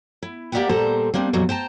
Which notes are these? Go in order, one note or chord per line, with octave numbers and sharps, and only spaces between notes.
E4
A#3 G4 D5 E5 F#5 G5
A#2 G3 A4 C5 A#5
G3 A#3 C4 D4
F2 A#2 E3 F#3 G3
C5 G5 A5 A#5